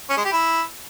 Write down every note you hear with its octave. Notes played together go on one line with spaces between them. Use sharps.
C#4
G#3
G4
E4